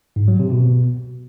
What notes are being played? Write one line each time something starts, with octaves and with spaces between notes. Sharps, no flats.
G#2
F#3
C3
B2